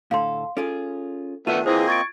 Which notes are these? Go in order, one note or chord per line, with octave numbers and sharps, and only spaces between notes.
A2 D3 A4 F5 C6
C#4 F4 G#4 A4
D#3 A3 B3 D4 F4 E5 D#7
E3 A#3 C4 E4 G#4 C5 D#5
C#6 G#6 A6 D7